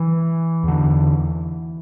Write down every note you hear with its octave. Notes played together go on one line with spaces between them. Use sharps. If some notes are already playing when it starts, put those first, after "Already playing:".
Already playing: E3
E2 D3